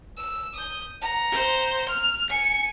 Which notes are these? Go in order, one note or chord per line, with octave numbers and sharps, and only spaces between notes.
E6
D#6 G6
F#5 A#5
C5
F6
G#5 C#7